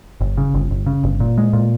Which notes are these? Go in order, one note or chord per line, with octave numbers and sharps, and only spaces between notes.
G1
C#3
G1
G1
C#3
G1
A#2
G#3
A#2